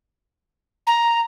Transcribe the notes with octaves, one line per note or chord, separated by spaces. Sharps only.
A#5